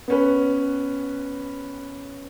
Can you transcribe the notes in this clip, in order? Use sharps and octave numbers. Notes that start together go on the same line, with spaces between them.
B3 C#4 B4